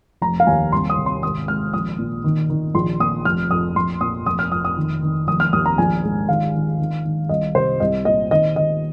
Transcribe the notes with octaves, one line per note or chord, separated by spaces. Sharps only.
F1 A#5
F5
D#2 G#5
C2 C6
D#6
C3
C6
G#1 D#6
G#2 F6
A#1 D#6
A#2
D#3
D#3
A#1 C6
A#2 D#6
F1 F6
F2 D#6
A#1 C6
A#2 D#6
F1 D#6
F6
F2 D#6
D#6
D#3
D#3
F1 D#6
F6
D#2 D#6
A#5
A#1 G#5
G#2
D#3 F5
D#3
D#3
D#3
C2 D#5
C3 C5
C2 D#5
A#2 D#5
D#3 D#5
D#3 D#5